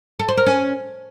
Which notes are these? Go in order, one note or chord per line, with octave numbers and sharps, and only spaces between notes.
A4
C5
A#4
C#4